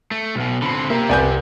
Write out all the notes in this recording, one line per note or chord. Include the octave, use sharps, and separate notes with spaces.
A3
B1 B2
D3 C4 B5
A#3 G4 E5
C2 B4 D5 G#5 G6